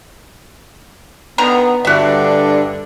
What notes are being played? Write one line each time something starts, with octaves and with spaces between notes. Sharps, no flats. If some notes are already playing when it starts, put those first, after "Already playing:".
D3 D#3 B3 A#5
G2 D3 D4 F#4 E5